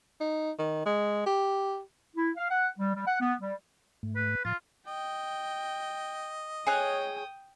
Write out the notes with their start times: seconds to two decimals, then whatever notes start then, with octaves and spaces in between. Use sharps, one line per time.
0.21 D#4
0.59 D#3
0.86 G#3
1.26 G4
2.16 E4
2.37 F5
2.50 F#5
2.79 G3
2.95 G3
3.07 F#5
3.20 B3
3.41 G3
4.03 G#2 A3
4.16 B4
4.45 A2 F3 F4 A6
4.88 D#5 G5
6.67 G#4 C#5 G5 D#6 F#6